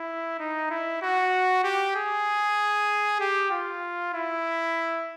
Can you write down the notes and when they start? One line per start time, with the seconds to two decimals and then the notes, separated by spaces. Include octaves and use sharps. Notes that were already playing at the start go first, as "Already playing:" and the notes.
Already playing: E4
0.39 D#4
0.70 E4
1.02 F#4
1.64 G4
1.95 G#4
3.20 G4
3.51 F4
4.14 E4